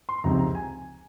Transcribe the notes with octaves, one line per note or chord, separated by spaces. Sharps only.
C6
C#2 C3 F3 C4 D#4 A#5
A#5
G#5